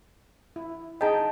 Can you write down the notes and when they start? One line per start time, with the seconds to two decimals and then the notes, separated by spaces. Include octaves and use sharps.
0.56 E4
1.01 D#4 G#4 D#5 G5 A5 A#5